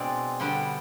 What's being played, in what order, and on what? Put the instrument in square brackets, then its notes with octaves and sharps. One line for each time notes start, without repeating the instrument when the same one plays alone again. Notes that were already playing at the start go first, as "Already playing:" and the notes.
Already playing: [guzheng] B2 G#3 C4 D4 D5
D3 G3 B3 G5